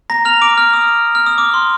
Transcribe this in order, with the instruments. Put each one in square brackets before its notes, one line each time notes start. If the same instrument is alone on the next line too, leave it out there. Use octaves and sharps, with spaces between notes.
[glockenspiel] A#5 A#6
F6 F7
D6 D7
F6
D#6
F6
D#6
D6
C6